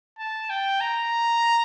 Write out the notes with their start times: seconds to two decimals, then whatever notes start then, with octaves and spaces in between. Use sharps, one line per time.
0.19 A5
0.50 G5
0.81 A#5